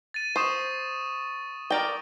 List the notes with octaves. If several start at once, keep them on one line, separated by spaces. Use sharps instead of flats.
A6 D#7
C5 C#6 D#6 E7
A#4 D5 G5